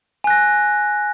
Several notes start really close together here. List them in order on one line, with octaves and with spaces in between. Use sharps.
G#5 F#6 A#6